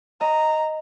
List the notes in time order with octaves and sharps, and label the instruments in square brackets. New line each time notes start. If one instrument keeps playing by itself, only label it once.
[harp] D#5 [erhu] A#5